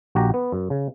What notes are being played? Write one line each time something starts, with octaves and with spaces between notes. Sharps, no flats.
A#1 F#4 G4 A#5
B3
F#2
C#3